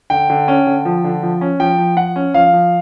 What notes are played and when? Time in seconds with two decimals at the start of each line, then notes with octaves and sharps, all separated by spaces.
0.10 D3 G5
0.30 D3
0.48 C#4
0.67 D3
0.85 F3
1.04 D3
1.23 F3
1.41 C#4
1.60 F3 G5
1.79 F3
1.97 F3 F#5
2.16 C#4
2.34 F3 F5
2.53 F3